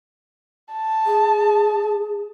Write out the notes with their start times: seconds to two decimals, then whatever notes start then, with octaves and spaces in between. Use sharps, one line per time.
0.73 A5
1.06 G#4